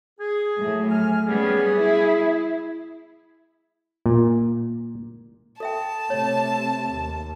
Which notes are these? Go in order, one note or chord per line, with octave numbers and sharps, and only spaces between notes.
G#4
A2 F#3
G#5 F6
G3 B3 C#4 G#4
E4
A#2
A4 E5 G5 A5
C3 A3 C#5
D#2